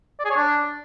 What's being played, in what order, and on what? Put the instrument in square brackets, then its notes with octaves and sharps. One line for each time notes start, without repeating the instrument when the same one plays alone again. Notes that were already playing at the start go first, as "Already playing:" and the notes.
[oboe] D5
G#4
C#5
D4